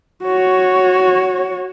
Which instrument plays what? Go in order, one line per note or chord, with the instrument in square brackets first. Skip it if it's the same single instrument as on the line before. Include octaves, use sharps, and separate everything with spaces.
[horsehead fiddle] F#4 C#5